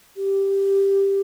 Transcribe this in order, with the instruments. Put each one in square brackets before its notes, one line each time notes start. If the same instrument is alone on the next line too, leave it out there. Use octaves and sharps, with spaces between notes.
[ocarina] G4